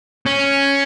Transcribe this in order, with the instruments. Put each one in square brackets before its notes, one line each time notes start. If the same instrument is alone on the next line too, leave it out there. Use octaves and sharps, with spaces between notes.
[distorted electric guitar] C#4